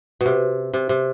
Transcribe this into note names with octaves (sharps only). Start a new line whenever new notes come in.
B2
C3
C3
C3